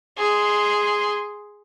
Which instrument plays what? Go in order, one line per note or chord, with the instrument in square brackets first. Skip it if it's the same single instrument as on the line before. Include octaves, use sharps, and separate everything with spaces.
[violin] G#4 C6